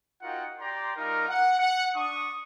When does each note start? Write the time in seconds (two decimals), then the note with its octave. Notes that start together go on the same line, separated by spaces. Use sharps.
0.22 D#4 F4 F#4 A#4 F#5 G5
0.60 G4 D5 G5 A#5 C6
0.96 G3 D#4 F4 A#4
1.28 F#5
1.59 F#5
1.96 D4 C#6 D#6